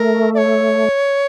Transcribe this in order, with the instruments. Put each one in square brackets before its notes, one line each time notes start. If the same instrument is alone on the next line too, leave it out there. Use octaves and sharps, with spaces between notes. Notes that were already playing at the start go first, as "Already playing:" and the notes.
Already playing: [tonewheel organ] A3 [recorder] A#4
[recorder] D5
C#5